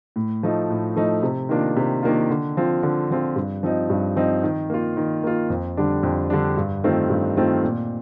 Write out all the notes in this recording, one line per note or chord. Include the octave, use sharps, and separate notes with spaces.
A2
F3 A3 D#4
A2
F3 A3 D#4
C3
D#3 A#3 D4 F4
C3
D#3 A#3 D4 F4
D3
F3 C4 F4
D3
F3 C4 F4
G2
F3 C4 D#4
G2
F3 C4 D#4
D#3
A#3 F4
D#3
A#3 F4
F2
D3 G3 D4
F2
D3 G3 D4
G2
D#3 A3 C4 F4
G2
D#3 A3 C4 F4
A#2